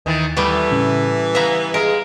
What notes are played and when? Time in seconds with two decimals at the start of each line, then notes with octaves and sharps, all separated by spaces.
0.06 D#2 D#3 E3 A6
0.37 E3 G3 A3 B3
0.71 A2 C#3 C#4
1.35 B3 B4 E5 F5 G#5 A#5
1.74 G#3 A#4